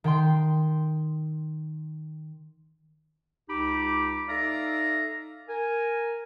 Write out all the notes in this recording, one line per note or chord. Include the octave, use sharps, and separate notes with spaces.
D#3 G5 C6
C#2 D#4 G4 B5 D6
D#4 A4 D5 E5 F5 A#5
A#4 G#5